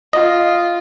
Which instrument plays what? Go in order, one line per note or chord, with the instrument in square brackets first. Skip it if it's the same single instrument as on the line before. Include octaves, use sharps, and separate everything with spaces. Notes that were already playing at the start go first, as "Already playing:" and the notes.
[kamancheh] F4 [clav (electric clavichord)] D#5